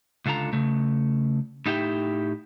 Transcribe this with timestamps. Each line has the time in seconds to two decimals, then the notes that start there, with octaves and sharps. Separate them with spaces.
0.26 C#2 D3 F4 A4 A#5
0.53 C#3 A3
1.66 A2 D#4 G4 E5 G5